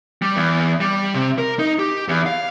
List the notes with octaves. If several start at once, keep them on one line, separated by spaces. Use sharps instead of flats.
G3
E2
G3
C3
A#4
D#4
G4
E2
F5